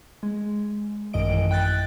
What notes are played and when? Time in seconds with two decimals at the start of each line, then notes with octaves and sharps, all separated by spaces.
0.23 G#3
1.13 A1 F#2 D#3 D#5 D7
1.29 E3
1.51 G5 F#6 A6